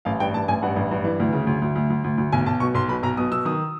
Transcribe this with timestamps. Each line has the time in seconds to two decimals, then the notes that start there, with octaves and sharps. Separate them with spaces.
0.05 A1 F5
0.20 G2 G5
0.34 A1 A5
0.48 A1 G#5
0.62 G2 F#5
0.76 A1
0.91 G2
1.04 E3
1.20 D2
1.33 C#3
1.47 D2
1.62 D2
1.76 D2
1.90 D2
2.04 D2
2.18 D2
2.32 B1 G#5
2.46 B1 A5
2.60 B2 C#6
2.75 B1 C6
2.88 B2 B5
3.03 B1 A#5
3.17 B2 D#6
3.31 B2 E6
3.45 D#3 D#6